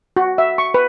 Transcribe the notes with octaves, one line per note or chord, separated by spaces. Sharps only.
F#4
E5
C#6
B4